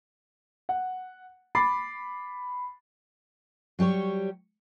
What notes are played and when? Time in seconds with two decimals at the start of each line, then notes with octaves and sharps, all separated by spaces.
0.69 F#5
1.55 B5 D6 A6 C7
3.79 F#3 G3 G4 C#5